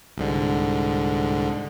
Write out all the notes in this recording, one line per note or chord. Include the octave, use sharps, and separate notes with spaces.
C2 G#2 D3